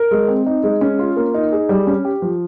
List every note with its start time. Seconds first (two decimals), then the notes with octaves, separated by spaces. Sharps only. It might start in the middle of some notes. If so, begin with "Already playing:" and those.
Already playing: A#4
0.11 G#3
0.28 C4
0.46 D#4
0.63 G#3
0.81 C#4
0.99 F4
1.17 A#3
1.34 D#4
1.52 G#4
1.69 G3
1.87 C#4
2.05 G4
2.22 F3